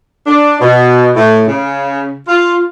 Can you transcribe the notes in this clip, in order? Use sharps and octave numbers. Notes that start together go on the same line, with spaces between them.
D4
B2
A2
C#3
F4